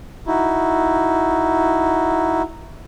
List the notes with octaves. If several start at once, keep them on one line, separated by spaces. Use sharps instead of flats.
D#4 E4 F#4